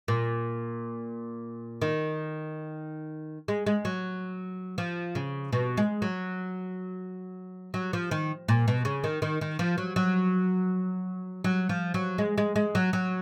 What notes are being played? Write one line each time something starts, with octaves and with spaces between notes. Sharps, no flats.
A#2
D#3
G#3
G#3
F#3
F3
C#3
B2
G#3
F#3
F#3
F3
D#3
A#2
B2
C#3
D#3
D#3
D#3
F3
F#3
F#3
F#3
F3
F#3
G#3
G#3
G#3
F#3
F#3